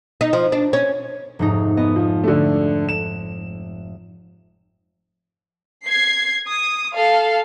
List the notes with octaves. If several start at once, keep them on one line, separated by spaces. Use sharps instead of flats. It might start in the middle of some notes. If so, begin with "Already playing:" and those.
D#4
F3
D4
C#4
F1 G#2 D#4
B3 D#5
F3
D3 A3
E7
G#6 C7
D#6
A4 F5